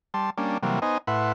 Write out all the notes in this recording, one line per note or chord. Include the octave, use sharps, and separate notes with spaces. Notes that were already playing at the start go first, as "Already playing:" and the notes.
G3 A5 C6
G3 A#3 C#4 D4
C3 E3 F#3 G3 A#3
B3 D#4 C5 D#5 G#5
A2 E4 B4 F#5 C6